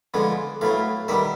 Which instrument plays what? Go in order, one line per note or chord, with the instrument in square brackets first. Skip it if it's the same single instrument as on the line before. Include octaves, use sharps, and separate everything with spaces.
[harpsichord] D3 F3 G#3 B3
A2 F#3 B3 F5
D#3 G3 B3 E5